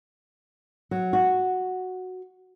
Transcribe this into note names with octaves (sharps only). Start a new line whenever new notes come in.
F#3
F#4